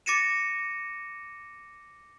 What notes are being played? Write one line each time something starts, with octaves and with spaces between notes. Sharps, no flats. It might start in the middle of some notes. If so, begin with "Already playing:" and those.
D6 A6 A#6 C#7 D#7 E7